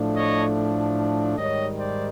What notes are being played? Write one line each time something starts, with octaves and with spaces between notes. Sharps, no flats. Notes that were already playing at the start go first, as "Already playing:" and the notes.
Already playing: A2 F3 A3 D4
C#5 D#5
G#2 D#3 G3 C#5 D#5
C5 D5